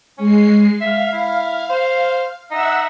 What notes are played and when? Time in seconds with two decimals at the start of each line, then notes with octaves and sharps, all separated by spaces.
0.18 G#3 C#4 C7
0.81 E5 F5
1.12 E4
1.69 C5
2.51 D#4 E5 F#5 E6